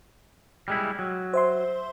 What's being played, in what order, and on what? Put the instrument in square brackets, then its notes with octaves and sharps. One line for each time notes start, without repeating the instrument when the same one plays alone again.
[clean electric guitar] G3 G#3 E4
F#3
[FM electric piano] C5 E5 C6